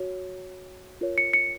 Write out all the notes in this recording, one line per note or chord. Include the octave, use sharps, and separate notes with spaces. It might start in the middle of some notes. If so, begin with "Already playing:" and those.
Already playing: F#4 C#5
F4 A#4 C#5
C#7
C#7